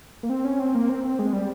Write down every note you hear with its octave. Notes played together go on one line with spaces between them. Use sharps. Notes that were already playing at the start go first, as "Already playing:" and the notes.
A#3
C4
C#4
C4
A#3
C4
C4
G#3
G3